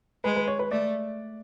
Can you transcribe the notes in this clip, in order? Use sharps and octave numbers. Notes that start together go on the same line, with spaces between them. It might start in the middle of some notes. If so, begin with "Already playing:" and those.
G#3 B4
B4
C#5
B4
A3 D5